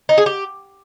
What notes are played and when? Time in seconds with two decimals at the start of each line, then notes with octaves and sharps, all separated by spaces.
0.09 D#4
0.18 G#4
0.26 G4